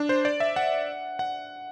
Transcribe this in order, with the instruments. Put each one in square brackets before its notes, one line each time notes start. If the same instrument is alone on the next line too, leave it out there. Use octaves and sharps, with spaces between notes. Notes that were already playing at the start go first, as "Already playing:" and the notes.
Already playing: [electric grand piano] D4
C5
D5
E5
F#5
F#5